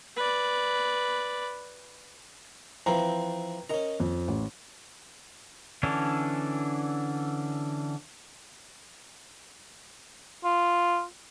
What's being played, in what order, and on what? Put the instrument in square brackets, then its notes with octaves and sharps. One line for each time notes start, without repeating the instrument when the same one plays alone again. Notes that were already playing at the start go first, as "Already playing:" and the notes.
[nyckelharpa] B4 D5
[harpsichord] E3 F3 C4 [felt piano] B4 G5 A#5
[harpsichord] C#4 A#5 [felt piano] A#4 D#5
[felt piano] F2
A1
[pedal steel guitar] D3 E3 C#4 D4
[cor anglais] F4